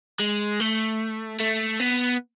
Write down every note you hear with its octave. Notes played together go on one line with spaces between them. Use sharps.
G#3
A3
A3
B3